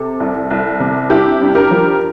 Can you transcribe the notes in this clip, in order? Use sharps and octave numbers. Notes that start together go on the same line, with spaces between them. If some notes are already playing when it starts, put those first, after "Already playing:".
Already playing: C3 A4
C2
C2
C3
G2 E4 G4
G2
G4 A#4
F3